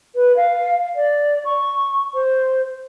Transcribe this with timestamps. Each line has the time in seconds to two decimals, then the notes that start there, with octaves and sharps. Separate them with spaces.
0.15 B4
0.36 F5
0.96 D5
1.45 C#6
2.14 C5